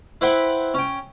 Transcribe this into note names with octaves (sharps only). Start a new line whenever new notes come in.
E4 B4 C5 E5 F#5 G5
C#4 G5